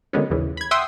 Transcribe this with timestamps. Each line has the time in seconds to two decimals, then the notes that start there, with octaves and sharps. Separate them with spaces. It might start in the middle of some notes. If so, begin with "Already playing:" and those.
0.13 D3 D#3 F#3 G#3 B3 C#4
0.30 A#1 D#2 C#3 E3
0.57 B5 G#6
0.71 E5 F#5 G5 C6 D#6 E6